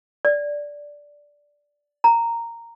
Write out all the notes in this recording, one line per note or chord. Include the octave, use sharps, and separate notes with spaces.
D5
A#5